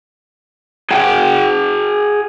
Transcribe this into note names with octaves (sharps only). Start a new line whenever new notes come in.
G#4 F#5 G5